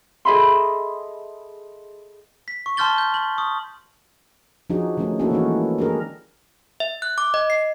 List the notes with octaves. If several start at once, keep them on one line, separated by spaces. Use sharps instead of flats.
G#4 A4 D#5 E5 B5 C6
B6
C#6
A5 C6 F6 G6 A6 G7
G6
F#7
C#6 D#6
F3 D4 D#4 F#4 G#4
D#3 F3 A3 C#4
A#3 C#4 D4 E4 F#4 A4
D#3 E3 G#3 D#4 F#4
D4 G4 G#4 A#4
E5
F#6
D6
D#5
C7